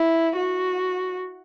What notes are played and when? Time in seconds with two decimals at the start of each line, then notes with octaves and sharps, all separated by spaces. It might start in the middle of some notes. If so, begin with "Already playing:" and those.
Already playing: E4
0.36 F#4